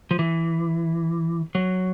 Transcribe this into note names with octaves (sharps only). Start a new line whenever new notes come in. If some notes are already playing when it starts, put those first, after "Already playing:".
F3
E3
F#3